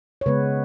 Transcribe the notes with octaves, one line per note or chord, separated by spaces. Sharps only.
C#5
C#3 G#3 B3 B4